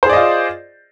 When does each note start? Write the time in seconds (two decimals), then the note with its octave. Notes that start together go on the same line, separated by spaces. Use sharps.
0.03 C5
0.06 G#4
0.09 D5
0.13 D#5
0.16 F4